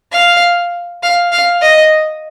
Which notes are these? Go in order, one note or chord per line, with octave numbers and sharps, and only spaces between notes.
F5
F5
F5
D#5